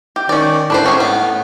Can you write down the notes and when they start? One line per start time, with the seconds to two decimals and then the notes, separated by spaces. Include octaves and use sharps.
0.16 G4
0.29 D#3 C#4 D5
0.70 A2 D4 B4 C5
0.86 C#4 G#4
1.00 B3